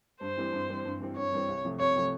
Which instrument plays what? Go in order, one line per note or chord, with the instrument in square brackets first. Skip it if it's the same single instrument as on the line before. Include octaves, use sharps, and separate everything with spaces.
[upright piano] G2 [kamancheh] C5
[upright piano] E3 G3 C4
G2
E3 G3 C4
G2
E3 G3 C4
[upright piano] G2 [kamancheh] C#5
[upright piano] E3 G3 C4
C2
C3 F3 A3
[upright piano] C2 [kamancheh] C#5
[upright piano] C3 F3 A3